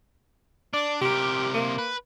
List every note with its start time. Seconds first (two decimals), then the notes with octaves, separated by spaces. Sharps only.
0.73 D4 D5
1.01 C3 G4 A#4
1.54 A#3
1.78 B4